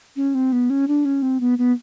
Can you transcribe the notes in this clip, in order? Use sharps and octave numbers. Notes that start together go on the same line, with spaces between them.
C#4
C4
B3
C#4
D4
C#4
C4
B3
B3